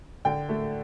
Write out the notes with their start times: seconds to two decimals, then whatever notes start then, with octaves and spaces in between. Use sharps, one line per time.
0.25 D3 G5
0.49 A3